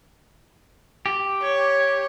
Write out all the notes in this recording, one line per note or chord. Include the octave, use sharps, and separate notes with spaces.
G4
C#5